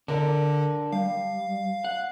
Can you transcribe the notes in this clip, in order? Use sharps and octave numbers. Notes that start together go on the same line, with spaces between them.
D3 D4 A#4 D5
G3 F5
F#5